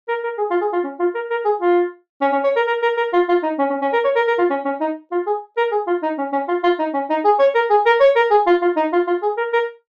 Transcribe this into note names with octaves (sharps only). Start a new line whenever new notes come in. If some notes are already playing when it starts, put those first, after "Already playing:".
A#4
A#4
G#4
F4
G#4
F4
C#4
F4
A#4
A#4
G#4
F4
C#4
C#4
C#5
A#4
A#4
A#4
A#4
F4
F4
D#4
C#4
C#4
C#4
A#4
C#5
A#4
A#4
F4
C#4
C#4
D#4
F4
G#4
A#4
G#4
F4
D#4
C#4
C#4
F4
F4
D#4
C#4
D#4
G#4
C#5
A#4
G#4
A#4
C#5
A#4
G#4
F4
F4
D#4
F4
F4
G#4
A#4
A#4